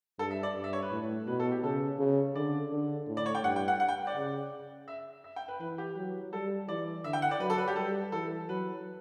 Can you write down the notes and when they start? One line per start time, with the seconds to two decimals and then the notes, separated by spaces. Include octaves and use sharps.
0.19 G2 A4
0.31 E5
0.43 D5
0.56 G2
0.64 E5
0.73 C#5
0.82 B4
0.92 A2
1.27 B2 B4
1.40 A4
1.52 G4
1.64 C#3 A4
1.99 C#3
2.35 D3 D5
2.72 D3
3.07 A2
3.17 D5
3.26 C#5
3.35 G5
3.43 G2 F#5
3.56 G5
3.68 F#5
3.80 F#5
3.89 G5
4.07 D5
4.16 C#3
4.88 E5
5.24 E5
5.36 G5
5.48 B4
5.60 E3 B4
5.78 G4
5.96 F#3
6.32 G3 A4
6.68 E3 D5
7.04 D3 E5
7.13 G5
7.22 F#5
7.31 D5
7.40 F#3 B4
7.50 A4
7.58 B4
7.68 G4
7.76 G3 A4
8.12 E3 A4
8.48 F#3 B4